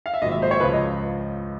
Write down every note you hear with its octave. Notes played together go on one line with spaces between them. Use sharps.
F5
E5
A#1 G#2 D#3 F#3 D#5
E5
C5
C#5
C#2 C#3 F3 B4
D#5